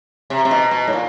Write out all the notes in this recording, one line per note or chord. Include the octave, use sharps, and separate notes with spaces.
C3
C3
B2
B2
A2
A#2